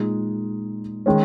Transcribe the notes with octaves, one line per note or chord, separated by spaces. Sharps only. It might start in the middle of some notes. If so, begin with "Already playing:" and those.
Already playing: A#2 G#3 D#4 G#4
D#3 G#3 C#4